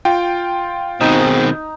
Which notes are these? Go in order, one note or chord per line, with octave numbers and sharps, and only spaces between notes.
F4 G5
G#2 B2 D#3 C4 D#4